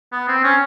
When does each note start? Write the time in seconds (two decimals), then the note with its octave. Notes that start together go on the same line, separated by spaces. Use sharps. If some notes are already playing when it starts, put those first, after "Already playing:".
0.12 B3
0.28 C4
0.44 C#4